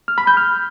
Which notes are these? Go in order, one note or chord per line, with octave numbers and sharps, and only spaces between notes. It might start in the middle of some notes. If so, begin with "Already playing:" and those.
F6
B5
G6
F6